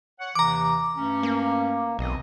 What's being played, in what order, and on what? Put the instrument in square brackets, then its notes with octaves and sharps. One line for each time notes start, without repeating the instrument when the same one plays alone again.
[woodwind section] C#5 F#5
[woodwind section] D#2 C3 E3 [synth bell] A#5 D6
[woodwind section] G2 A3 C#4
[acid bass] A#3
[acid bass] B1 [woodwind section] E3 C4 D#5